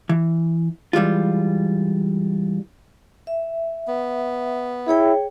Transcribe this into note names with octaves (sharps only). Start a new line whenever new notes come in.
E3
E3 G3 G#3 F4
E5
B3
E4 G#4 C#5 G5